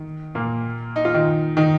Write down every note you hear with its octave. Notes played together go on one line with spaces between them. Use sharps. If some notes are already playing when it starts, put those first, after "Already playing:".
Already playing: D#3
A#2 A#3
D#4
F4
D#3 D#4
D#3 D#4